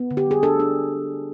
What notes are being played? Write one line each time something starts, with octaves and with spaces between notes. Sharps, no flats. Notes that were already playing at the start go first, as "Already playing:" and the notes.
Already playing: B3
D3
G4
G3 G#4
D4 A4
D4